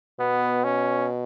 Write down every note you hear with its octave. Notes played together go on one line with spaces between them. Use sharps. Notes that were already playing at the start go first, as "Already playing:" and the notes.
B2 B3
C#4